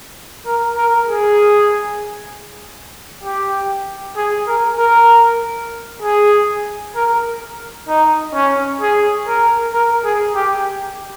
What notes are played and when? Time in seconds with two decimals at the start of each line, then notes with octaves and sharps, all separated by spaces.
0.46 A#4
0.77 A#4
1.07 G#4
3.23 G4
4.17 G#4
4.47 A#4
4.78 A#4
6.02 G#4
6.96 A#4
7.88 D#4
8.34 C#4
8.81 G#4
9.27 A#4
9.73 A#4
10.04 G#4
10.35 G4